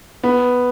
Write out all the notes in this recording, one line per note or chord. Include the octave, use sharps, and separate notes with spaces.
B3